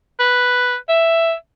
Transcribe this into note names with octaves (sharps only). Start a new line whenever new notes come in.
B4
E5